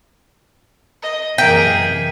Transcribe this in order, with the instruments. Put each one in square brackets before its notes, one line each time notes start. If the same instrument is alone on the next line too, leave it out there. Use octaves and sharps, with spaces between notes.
[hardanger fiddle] D#5
[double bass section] F#2 C3 E3 [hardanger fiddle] A#3 G#4 [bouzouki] G5 [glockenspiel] B6 D#7